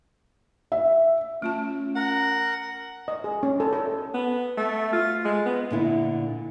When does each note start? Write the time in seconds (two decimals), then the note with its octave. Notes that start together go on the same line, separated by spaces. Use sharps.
0.72 E5
1.42 A3 C#4 F4 A5
1.96 A#4 F#5
3.08 D#5
3.24 G#4
3.43 C#4
3.60 A4
3.73 A4
4.14 B3
4.57 A3
4.93 F4
5.25 G#3
5.46 B3
5.70 A#2 D3 E4